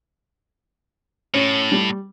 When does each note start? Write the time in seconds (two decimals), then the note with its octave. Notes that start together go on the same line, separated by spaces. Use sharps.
1.34 A2 C#4
1.72 G3